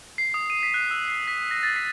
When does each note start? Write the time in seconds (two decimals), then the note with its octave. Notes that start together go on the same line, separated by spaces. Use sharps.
0.18 C7
0.34 D#6
0.50 D#7
0.63 B6
0.74 F#6
0.91 E6
1.08 C7
1.28 B6
1.51 A#6
1.63 A6
1.76 B6